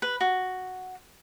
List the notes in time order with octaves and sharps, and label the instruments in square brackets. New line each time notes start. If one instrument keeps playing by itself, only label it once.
[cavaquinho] B4
F#4